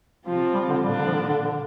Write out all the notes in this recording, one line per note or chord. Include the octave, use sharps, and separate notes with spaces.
C3 F3 C4 F4
G3
D3
A#2 G3 A#3 D4 F4
D3
F3
D3
D3
D3